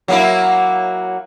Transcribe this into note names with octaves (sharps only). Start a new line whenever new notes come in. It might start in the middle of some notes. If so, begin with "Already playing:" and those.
F#3 A#3 E4